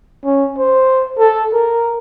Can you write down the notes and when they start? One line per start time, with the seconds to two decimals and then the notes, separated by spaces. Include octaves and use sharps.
0.25 C#4
0.58 C5
1.19 A4
1.53 A#4